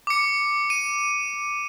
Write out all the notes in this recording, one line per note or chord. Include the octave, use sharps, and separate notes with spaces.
D6 C#7
D#7